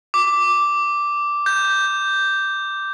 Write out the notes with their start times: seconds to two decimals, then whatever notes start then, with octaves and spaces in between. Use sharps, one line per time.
0.14 D6
1.46 G6